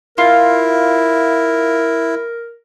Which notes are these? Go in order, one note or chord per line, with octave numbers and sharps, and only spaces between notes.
E4 F4 A#4